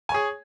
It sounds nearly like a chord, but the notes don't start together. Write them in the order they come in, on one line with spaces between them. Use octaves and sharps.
G#5 C#5 G#4